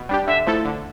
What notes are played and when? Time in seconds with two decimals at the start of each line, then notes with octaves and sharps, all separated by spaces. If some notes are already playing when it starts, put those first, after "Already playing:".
Already playing: B2
0.09 G3 D4 G4
0.27 D3 E5
0.46 F3 A3 E4 A4
0.65 D3